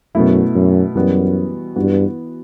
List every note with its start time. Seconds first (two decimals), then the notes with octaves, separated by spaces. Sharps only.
0.15 F#2 B2 A3 E4
0.55 F#2
0.95 F#2 E3 G3 B3 F#4
1.76 G2 E3 B3 F#4